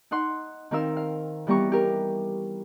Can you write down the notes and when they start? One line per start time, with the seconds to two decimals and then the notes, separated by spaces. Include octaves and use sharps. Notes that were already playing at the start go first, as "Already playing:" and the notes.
0.11 D#4 F#5 C6
0.71 D#3 C4 A#4 F5 E6
0.97 F5
1.47 E3 G3 B3 G4 A#5 C#6
1.72 G4 A#4